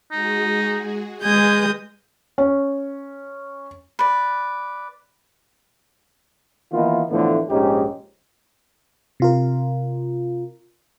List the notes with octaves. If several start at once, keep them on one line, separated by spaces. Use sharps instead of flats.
G#3 D#4 F#4 G#4
G#3 B4 G#5 D#6 G6
C#4
B4 D5
D#3 E3 A#3 B3 D#4 F4
A2 D3 E3 F3 A3 B3
A#1 G#2 C#4 D#4 G4
C3 F4 A#4